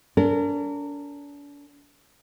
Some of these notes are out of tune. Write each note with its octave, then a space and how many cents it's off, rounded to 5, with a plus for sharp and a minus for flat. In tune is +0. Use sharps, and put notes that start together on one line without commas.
D4 -40 A#4 -30